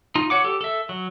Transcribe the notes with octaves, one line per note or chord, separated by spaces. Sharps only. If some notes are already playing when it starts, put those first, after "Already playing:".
D#4 F4
F#4 C#5 F#5 D6
G4 A4
A4 E5
F#3